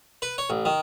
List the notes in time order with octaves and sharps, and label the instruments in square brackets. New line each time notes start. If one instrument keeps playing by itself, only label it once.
[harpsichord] B4
C#5
A1
D#3